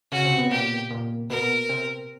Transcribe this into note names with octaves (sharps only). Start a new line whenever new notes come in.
C#3 C#4 F#4
C3 C4
B2 B3
A#2 A#3 G4
A#2 A#3
B2 B3 A#4
C3 C4